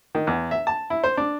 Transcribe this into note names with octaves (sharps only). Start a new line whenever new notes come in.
D#3
E2
E5
A5
E4
C5
D4